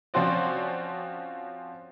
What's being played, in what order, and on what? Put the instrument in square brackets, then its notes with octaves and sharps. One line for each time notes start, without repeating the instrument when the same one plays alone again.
[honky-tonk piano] F3 C4 C#4 F#4 C5 D5